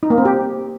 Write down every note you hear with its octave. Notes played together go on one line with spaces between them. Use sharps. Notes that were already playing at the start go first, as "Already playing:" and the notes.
D#4
A#3
C4
G4